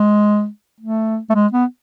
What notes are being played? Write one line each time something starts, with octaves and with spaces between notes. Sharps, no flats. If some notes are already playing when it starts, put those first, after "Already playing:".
Already playing: G#3
A3
A3
G#3
B3